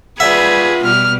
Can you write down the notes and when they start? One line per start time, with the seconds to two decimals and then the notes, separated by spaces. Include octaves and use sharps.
0.20 F4 G#4 B4 D5 E5 F#5 G#6
0.85 B2 G3 F6